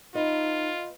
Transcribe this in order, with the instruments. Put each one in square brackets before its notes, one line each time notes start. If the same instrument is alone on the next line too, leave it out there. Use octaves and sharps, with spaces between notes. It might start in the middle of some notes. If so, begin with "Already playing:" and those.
[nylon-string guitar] B3 D#5 [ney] D#4 [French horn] F4